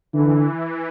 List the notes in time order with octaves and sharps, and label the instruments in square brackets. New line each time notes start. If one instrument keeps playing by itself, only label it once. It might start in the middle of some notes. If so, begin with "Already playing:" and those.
[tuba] D3 [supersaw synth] E3